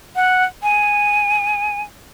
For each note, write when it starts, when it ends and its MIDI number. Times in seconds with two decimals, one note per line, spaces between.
0.16 0.44 78
0.63 1.82 80